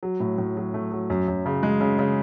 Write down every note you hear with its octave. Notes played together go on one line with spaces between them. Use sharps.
F#3
A2
A2
F#3
A3
F#3
F#2
F#2
C#3
G#3
C#3
C#3